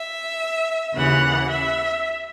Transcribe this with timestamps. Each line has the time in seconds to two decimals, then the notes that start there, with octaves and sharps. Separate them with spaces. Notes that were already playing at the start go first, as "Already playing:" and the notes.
Already playing: E5
0.94 D#2 C#3 E3 F#5
1.50 E5